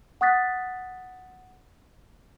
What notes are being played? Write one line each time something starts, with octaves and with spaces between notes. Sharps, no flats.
F#5 C#6 D#6 F#6 A6 B6